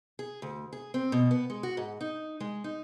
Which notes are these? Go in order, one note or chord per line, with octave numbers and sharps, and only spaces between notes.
G#4
D2
G#4
C4
B2
B3
G#3
F#4
G#2
D#4
G#3
D#4